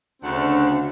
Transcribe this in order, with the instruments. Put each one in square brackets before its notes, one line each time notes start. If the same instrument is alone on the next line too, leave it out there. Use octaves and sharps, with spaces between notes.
[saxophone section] D2 C#3 C4 D4 F#5